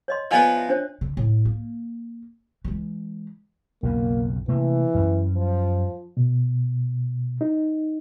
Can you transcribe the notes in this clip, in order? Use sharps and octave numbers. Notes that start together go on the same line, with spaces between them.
C#5 D#5 C6
F3 B3 B4 D5 D#5 G#5
E5
D4 C5 C#5
D3
A2
A#3
E3 G#3
B1 F2 C#3 A#3
C3 E3 A3 A#3
F#2 G3 C#4
F3
B2
D#4